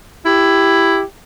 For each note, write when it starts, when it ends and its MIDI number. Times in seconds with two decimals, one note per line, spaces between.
0.26 1.01 64
0.26 1.03 67